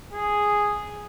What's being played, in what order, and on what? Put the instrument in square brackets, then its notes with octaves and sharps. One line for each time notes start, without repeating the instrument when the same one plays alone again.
[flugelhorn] G#4